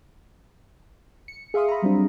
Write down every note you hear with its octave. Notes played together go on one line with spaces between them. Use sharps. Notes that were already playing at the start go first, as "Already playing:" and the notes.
C#7
G#4 E5 F5 C6 D#6
A#5 B5
F#3 G3 C4 D4